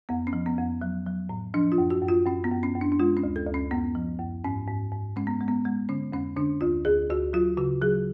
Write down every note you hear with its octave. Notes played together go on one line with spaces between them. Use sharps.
F2 B3
C#4
F3
B3
F2
F#3
F#3
A2
F3 D4
F4
F#2
F#4
F#2
F4
F#2 C#4
B3
F#2
C#4
F#2
D4
D4
G#3 F4
C#4
D2
A4
D2
C#4
F#2 B3
F3
F#2
G#2 C#4
G#2
G#2
G#3 C#4
B3
G#3
B3
G#3
D3 C#4
F2 C#4
D3 D4
D2 F4
D2 G#4
D2 F#4
F#3 F4
C#3 F#4
F#3 G#4